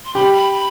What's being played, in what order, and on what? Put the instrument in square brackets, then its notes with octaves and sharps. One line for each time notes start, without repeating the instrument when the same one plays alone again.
[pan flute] C6
[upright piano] G4 [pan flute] B5
[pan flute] B5
B5